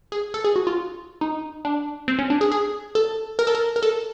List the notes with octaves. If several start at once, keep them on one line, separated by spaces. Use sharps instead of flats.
G#4
A4
G#4
F#4
F4
D#4
D4
C4
C#4
D4
G#4
G#4
A4
A#4
A4
A#4
A#4
A4